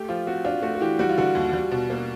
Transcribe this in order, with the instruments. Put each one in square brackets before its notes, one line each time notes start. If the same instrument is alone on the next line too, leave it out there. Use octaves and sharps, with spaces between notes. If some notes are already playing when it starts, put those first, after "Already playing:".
Already playing: [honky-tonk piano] A3 [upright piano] G4
[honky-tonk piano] F3 [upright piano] F4
[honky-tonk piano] C4 [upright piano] F#4
[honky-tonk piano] D4 [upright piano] F4
[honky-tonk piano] A3 [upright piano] F#4
[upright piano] F#4
[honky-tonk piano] E3 [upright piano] G4
[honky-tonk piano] G3 [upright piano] F#4
[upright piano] F4
[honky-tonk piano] D3 [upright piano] F#4
[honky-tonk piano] D#2
G3
B2
A#3